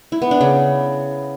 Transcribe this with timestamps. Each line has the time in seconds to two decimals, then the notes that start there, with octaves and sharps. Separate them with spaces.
0.12 E4
0.22 B3
0.31 D4
0.41 C#3